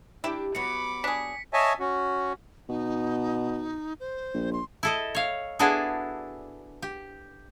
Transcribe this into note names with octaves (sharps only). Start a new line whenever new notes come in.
D4 E4 G4
F#3 B3 B5 D6 C#7
D4 G#4 B6
C#5 D#5 E5 G#5 A5
C#4 F#4
B2 D#4
C5
A#1
C6
E4 A4 D#5
C#5 F5
B3 D4 E4 F#4 G#4 A4
G4